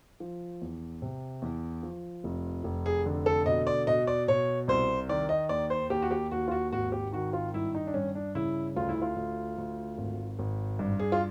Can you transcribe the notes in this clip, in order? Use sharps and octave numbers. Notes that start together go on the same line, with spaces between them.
F3
E2
C3
E2
F3
F1
F1
G#4
D3
A4
B2 D#5
D5
B2 D#5
D5
B2 C#5
C2 C5
D#3 D5
D#5
D#2 D5
C5
D#2 G4
F#4
G4
D#2 F#4
F4
F#4
G#1 F#4
G4
D#3 F#4
F4
G2 E4
D#4
D4
G2 C#4
D4
C#3 E4
D2 F4
E4
F4
D2
D2
G#1
G#1
G2
G#4
F4